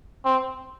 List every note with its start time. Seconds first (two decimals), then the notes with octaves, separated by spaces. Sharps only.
0.25 C4